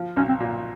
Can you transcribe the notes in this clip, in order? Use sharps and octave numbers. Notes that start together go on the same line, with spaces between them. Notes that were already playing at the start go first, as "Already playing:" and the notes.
Already playing: F3
B1 C#4
C4
A#2